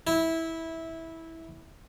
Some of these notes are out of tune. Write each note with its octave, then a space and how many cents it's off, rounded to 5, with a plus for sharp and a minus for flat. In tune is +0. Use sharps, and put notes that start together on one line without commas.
E4 -15